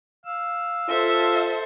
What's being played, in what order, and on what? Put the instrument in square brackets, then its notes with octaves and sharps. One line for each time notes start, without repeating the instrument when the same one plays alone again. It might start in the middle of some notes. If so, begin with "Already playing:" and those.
[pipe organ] F5 E6
[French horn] F4 [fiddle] A4 C5 [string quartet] E5 A5